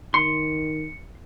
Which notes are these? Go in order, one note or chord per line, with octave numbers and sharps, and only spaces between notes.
D#3 C6 C#7